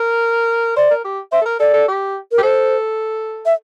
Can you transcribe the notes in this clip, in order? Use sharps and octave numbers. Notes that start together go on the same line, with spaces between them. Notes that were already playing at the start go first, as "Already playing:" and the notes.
Already playing: A#4
C5 D5
A#4
G4
C5 E5
A4
A#4
A4 D5
A4
G4
A#4
G4
A4 C5
E5